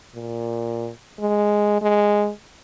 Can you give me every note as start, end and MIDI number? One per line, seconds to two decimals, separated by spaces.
0.15 0.89 46
1.20 1.79 56
1.81 2.30 56